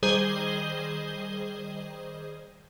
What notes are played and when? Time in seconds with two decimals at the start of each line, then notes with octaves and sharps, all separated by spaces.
0.03 D#3 G3 G#4 C5 D#5 G7